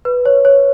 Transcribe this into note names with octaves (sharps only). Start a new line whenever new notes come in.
B4
C#5
C#5